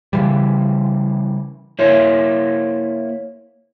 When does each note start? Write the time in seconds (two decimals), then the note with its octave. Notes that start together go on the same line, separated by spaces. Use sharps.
0.13 C#3 E3 G3
1.79 A#3 E4 C5 C#5